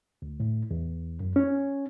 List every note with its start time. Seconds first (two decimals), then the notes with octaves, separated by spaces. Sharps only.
0.22 D2
0.40 A2
0.71 E2
1.20 F#2
1.36 C#4